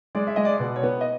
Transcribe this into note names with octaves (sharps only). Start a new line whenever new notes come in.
G#3 D5
E5
G#3 D#5
D5
B2
C#5
B3
D#5